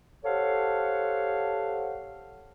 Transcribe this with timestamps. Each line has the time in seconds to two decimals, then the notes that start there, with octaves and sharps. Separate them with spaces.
0.25 G4 A4 C5 C#5 F5 F#5